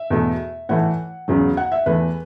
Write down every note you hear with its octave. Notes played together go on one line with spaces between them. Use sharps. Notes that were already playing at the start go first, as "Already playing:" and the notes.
Already playing: E5
E2 B2 A3
A2 E3 A3 F#5
E2 C#3 F#3
F#5
E5
E2 E3 A3 B4